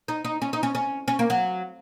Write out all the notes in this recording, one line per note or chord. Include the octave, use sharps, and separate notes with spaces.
D#4
D#4
C#4
D#4
C#4
C#4
C#4
A#3
F#3